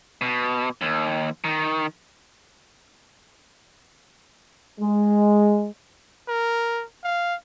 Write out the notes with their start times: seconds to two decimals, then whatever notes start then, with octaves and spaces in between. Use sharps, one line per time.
0.21 B2
0.81 D#2
1.44 D#3
4.80 G#3
6.28 A#4
7.04 F5